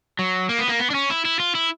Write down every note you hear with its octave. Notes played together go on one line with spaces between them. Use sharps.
F#3
A#3
B3
A#3
B3
D4
C#4
E4
E4
F4
E4